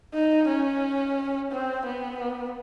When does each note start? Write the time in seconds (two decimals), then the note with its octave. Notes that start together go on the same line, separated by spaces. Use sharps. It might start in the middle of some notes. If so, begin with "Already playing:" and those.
0.14 D#4
0.48 C#4
1.51 C4
1.85 B3